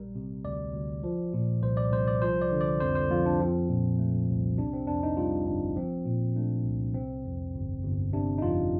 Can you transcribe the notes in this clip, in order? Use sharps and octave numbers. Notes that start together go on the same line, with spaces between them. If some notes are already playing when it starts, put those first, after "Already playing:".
Already playing: A#1 G3 A#4
C3
D2 D5
D2
F3
A#2
C2 C5
D5
C2 C5
D5
F3 C5
D5
D3
D5
F2 C5
C5
F2 F4
D4
F3 C4
A#2
A3
C2
C3 D4
C4
F2 D4
D#4
G3 F4
G1 D4
F3 C4
A#2
A3 D4
C2
C3 C4
F2
G1
G1
C3 D4
D#4
F2 F4